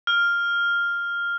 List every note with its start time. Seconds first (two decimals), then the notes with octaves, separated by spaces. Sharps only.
0.07 F6